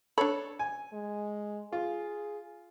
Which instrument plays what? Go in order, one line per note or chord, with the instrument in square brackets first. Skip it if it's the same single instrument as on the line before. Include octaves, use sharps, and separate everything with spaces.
[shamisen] D4 B5 [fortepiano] A4 C#5
[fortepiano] G#5
[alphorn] G#3
[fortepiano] F4 [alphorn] G#4